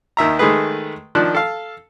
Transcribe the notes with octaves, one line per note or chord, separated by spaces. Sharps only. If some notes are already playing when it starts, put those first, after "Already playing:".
D#2 D#3 E5 A#5
D#3 G#3 A3 G#4 B4
D#3 F3 D4 F#6
A4 F5